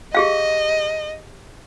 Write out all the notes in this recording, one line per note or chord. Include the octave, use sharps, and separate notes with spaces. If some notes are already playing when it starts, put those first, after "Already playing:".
G4 G#4 D#5 F5